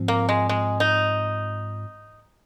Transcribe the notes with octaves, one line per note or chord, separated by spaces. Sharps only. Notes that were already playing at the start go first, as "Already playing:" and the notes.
Already playing: G#2 F3 C4
A#3
G#3
G#3
D#4